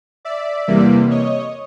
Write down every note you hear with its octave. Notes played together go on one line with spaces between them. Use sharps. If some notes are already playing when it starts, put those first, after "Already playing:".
D5 E5
E2 C3 E3 G3 A#3
C#5 D#5